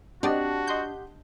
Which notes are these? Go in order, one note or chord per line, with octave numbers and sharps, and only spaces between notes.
C4 D4 F#4 G4 D5 D#5 F#5
D#5 C6 G6